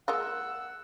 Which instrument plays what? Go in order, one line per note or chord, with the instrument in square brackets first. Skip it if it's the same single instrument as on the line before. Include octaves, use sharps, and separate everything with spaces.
[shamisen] G#3 A#3 F4 [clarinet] F#5 [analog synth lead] E6